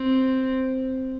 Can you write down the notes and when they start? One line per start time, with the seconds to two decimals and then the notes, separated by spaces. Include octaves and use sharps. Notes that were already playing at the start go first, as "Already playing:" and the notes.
Already playing: C4